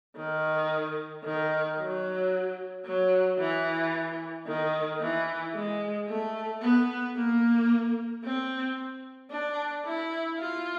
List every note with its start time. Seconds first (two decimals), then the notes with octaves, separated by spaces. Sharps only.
0.16 D#3
1.24 D#3
1.79 F#3
2.85 F#3
3.39 E3
4.47 D#3
5.01 E3
5.54 G#3
6.08 A3
6.61 B3
7.16 A#3
8.24 C4
9.30 D4
9.84 E4
10.38 F4